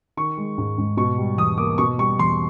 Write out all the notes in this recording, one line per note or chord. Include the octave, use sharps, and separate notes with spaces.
D#3 C#6
G#3
G#2
G#2
B2 C#6
G3
E2 D#6
A#3 D6
B2 C#6
G3 C#6
E2 C6